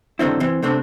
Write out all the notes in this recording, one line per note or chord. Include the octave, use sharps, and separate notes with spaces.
G2 D3 D#3 C4 E4
E3 C4
C3 A3 C4 D4